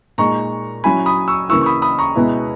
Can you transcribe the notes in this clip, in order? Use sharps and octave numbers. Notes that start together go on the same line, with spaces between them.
A#2 G#3 D#4 A#5 C#6
F#3 C#4 E4 G#5 B5
B5 D#6
C#6 E6
C#3 E3 A#3 E4 C#6 E6
C#6
B5 D#6
B5 D#6
A#5 C#6
B2 G#3 B3 E4